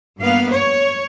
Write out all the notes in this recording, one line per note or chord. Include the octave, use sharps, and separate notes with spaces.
G2 A#3 B3 F5
C#5